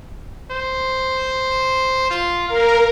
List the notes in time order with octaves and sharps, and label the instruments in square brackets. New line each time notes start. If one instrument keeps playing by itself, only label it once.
[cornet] C5
F4
[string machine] A#4 [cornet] F5